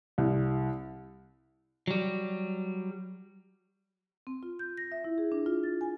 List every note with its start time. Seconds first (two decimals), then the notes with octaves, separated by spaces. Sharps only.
0.18 C2
1.88 F#3 G3
4.27 C4
4.43 F4
4.59 G6
4.78 A#6
4.92 E5
5.04 E4
5.18 G#4
5.32 D4
5.46 F4
5.64 A6
5.81 G#5